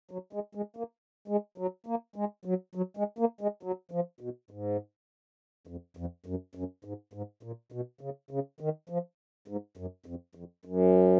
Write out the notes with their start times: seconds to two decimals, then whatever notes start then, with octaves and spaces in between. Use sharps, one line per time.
0.11 F#3
0.33 G#3
0.55 G#3
0.77 A#3
1.28 G#3
1.58 F#3
1.86 A#3
2.16 G#3
2.45 F#3
2.75 F#3
2.97 G#3
3.19 A#3
3.41 G#3
3.63 F#3
3.91 F3
4.21 B2
4.51 G#2
5.67 F2
5.97 F2
6.26 F#2
6.55 F#2
6.85 G#2
7.13 G#2
7.43 A#2
7.72 B2
8.01 C#3
8.31 C#3
8.61 D#3
8.89 F3
9.48 G#2
9.77 F#2
10.06 F2
10.35 F2
10.65 F#2